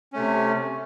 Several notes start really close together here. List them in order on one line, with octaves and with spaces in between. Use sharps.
C#4 A3 C3